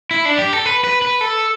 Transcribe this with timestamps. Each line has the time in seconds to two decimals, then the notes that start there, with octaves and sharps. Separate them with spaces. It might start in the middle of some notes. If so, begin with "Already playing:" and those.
0.11 E4
0.25 D4
0.38 G4
0.53 A4
0.66 B4
0.84 B4
1.02 B4
1.21 A4